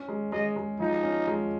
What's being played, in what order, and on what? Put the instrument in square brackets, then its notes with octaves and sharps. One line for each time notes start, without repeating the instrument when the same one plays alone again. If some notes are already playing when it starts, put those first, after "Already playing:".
Already playing: [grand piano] C#4
G#3
[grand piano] G#3 [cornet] D#5
[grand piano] G#3
[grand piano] F3 [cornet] D#4
[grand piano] C#4
G#3